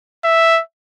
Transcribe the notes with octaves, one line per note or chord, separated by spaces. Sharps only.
E5